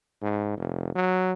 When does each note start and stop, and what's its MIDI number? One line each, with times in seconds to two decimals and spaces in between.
0.22 0.54 44
0.57 0.95 29
0.95 1.33 54